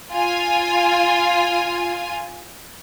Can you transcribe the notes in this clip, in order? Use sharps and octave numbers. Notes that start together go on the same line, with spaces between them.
F4 G#5